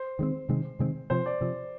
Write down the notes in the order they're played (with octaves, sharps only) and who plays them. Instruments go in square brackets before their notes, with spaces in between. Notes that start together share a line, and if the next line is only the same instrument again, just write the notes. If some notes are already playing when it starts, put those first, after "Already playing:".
Already playing: [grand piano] C5
[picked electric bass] D#3 G#3 C4
C3 D#3 G#3 C4
C3 D#3 G#3 C4
[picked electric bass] C3 F3 C4 [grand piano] C5
[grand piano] D5
[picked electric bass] C3 F3 C4